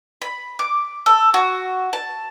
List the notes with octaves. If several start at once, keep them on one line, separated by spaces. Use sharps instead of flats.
B5
D6
A4
F#4
A5